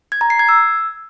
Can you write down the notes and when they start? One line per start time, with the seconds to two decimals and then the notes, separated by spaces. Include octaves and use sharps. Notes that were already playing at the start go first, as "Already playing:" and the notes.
0.12 G#6
0.21 A#5
0.30 C7
0.39 G#6
0.49 E6